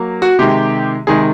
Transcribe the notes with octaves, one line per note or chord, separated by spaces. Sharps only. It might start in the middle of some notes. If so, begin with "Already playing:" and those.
Already playing: F#3 A#3
F#4
C3 D#3 G#3 G4
C3 D#3 G#3 G#4